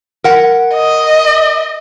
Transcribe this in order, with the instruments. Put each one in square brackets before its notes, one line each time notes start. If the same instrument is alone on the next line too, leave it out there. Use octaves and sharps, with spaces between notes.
[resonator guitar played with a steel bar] A#4 F#5
[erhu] D#5